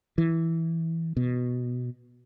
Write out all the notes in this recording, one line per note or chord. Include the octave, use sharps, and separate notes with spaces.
E3
B2